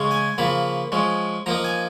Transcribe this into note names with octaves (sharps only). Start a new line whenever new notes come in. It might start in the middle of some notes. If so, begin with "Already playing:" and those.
Already playing: C#3 G#3 C#4
G#5
C#3 F3 A#3 B5
F3 G#3 C#4
F3 A#3 D#4 A#5
G#5